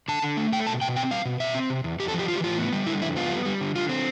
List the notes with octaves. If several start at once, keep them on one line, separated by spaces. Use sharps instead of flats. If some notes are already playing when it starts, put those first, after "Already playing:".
D3 A5
D3
A3
A3 G5
B2 A5
B2 G5
C4 G5
G3 F5
B2
B2 E5
C4
C3
E2
E2 G4
A4
F3 G4
E3 F4
G4
A2 F4
B3
G3
D3 E4
F2 E4
B3 F4
G3
G3
D3
D3 F4
C4